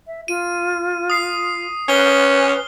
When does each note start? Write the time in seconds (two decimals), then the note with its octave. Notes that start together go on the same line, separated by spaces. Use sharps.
0.07 E5
0.28 F4 D#7
1.10 D#6 C7
1.88 C#4 B4 F6 G7